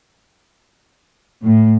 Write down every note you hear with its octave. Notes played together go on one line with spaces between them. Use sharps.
A2